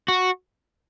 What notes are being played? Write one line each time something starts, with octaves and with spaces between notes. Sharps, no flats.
F#4